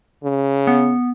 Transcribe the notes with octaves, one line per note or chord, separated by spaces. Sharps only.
C#3
B3